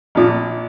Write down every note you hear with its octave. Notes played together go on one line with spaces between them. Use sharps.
A#1 A#2